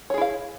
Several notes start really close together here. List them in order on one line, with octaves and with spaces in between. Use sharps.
C#5 G#4 E4 F5